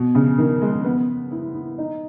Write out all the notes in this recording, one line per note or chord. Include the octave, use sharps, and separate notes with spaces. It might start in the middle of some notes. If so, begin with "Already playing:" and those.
Already playing: B2
C#3
D#3
G#3
B3
E4
E4
D#4